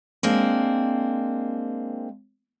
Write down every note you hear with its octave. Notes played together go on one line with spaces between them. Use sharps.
G#3 A#3 C4 D4